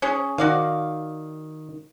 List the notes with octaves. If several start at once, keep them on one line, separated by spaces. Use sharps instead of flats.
C#4 G#4 C#5
D#3 F#4 D5 F5